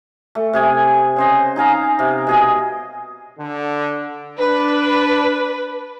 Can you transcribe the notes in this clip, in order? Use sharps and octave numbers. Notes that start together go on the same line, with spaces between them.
A3
C3 G#4 G#5
C#3 C5 D#5
D#4 G#4 F5 A#5
C3
B2 G#4 D#5
D3
D4 B4